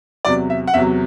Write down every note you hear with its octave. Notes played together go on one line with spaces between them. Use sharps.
E2 C3 F#3 D5
E5
F#5
E2 C3 F#3 E5